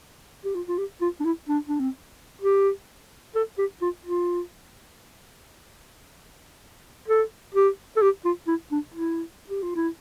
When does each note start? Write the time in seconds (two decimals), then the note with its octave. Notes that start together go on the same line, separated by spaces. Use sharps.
0.45 G4
0.55 F4
0.68 F4
0.78 G4
1.01 F4
1.20 D4
1.24 E4
1.49 D4
1.69 D4
1.80 C4
2.41 G4
3.35 A4
3.58 G4
3.82 F4
4.05 F4
7.08 A4
7.55 G4
7.97 A4
8.02 G4
8.25 F4
8.48 E4
8.72 D4
8.94 E4
9.49 G4
9.63 F4
9.75 E4